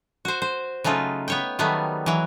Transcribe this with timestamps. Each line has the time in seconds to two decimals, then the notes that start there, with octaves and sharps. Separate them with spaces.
0.25 F#4 C5
0.42 C5
0.84 C#3 F#3 A3 D#4 F4
1.28 B3 C#5 G5
1.59 D#3 F#3 G3 A3 B3
2.06 E3 F#3